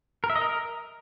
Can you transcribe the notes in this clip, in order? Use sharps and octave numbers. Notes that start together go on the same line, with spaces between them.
A#4
E5
D#5
A#4